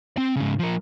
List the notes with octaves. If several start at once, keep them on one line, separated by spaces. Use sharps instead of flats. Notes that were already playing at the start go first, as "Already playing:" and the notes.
C4 G5
G#2 C#3
F3 A#4